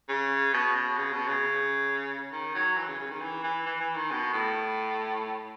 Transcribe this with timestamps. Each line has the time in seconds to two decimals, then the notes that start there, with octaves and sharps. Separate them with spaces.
0.09 C#3
0.53 B2
0.76 B2
0.98 C#3
1.13 B2
1.28 C#3
2.32 D#3
2.55 F#3
2.77 E3
2.88 C#3
2.99 C#3
3.10 D#3
3.21 E3
3.44 E3
3.66 E3
3.80 E3
3.96 D#3
4.11 B2
4.33 A2